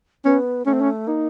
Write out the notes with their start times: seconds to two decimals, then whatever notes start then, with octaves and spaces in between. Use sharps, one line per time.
0.25 B3 C#4
0.65 A3 C#4
0.74 C4
0.81 C#4
1.07 A#3 D#4